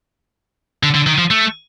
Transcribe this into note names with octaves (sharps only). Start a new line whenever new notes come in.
D3
D3
D#3
F3
A3